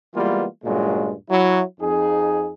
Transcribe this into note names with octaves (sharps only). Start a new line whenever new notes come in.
E3 G3 G#3 A#3 B3 F4
C#2 G2 A#2 F#3 G#3
F#3 E4
F2 D#4 G#4